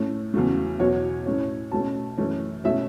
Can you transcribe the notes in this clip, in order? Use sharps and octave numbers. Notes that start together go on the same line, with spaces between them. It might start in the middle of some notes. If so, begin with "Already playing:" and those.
Already playing: A2 A3 C#4
E2 C#3 F#3 A3
E2 B2 F#3 C#5
A2 A3 C#4
B2 A3 C#4 A5
F#2 E3 A3 C#4
B2 A3 C#4 E5